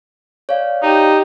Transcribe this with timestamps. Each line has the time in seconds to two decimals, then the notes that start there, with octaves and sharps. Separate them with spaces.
0.49 C#5 D5 F5
0.83 D#4 G4